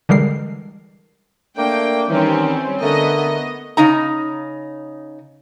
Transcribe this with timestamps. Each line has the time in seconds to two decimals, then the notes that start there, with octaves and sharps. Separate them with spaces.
0.09 D3 E3 G3 G#3 A#4 C7
1.57 A3 A#3 D4 G5
2.09 D#3 E3 G3 C4 C#4
2.81 D3 A3 B3 A#4 D#5
3.77 C#3 D#4 A#5